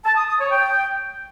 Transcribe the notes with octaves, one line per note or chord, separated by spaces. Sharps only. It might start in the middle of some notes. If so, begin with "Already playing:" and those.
A5
D#6
D#6
C#5
G5